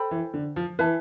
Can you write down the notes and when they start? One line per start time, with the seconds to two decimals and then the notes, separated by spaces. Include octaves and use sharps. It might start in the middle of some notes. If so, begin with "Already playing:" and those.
Already playing: A4 C5 G5 B5
0.11 E3
0.34 D3
0.56 F3
0.79 E3 B4 E5 A5